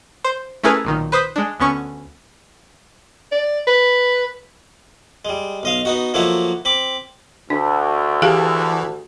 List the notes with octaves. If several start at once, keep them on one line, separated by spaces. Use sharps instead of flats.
C5
A3 C#4 E4 G#4 A#4 B4
B1 A#2 D#3
B4 C5 D#6 B6
G#3 D4
D2 B3 C#4 C#6
D5
B4
G3 G#3
B1 D#5 F5
B3 D#4 F#4
F3 F#3 A3 A#3 E4 F#4
C4 B5 D6
D2 D4
E3 G4 G#4 F5